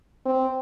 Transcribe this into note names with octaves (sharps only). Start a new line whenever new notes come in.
C4